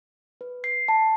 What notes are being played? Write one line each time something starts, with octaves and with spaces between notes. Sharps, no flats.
B4
C7
A5